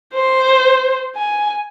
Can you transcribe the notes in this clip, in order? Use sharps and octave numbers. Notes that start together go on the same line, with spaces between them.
C5
G#5